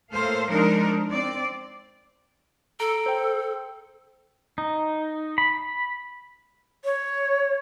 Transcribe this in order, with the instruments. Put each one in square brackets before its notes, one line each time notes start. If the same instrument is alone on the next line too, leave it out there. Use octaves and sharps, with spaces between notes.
[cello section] A2 A#3 A4 C5 F5
F3 G#3 D4 D#4 A#4 C5
C4 D5
[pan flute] A4 [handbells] A#5 D7
[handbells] C5 G5
[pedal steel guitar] D#4
B5
[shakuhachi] C#5